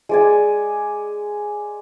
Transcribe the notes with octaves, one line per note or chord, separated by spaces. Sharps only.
G#3 D5 G#5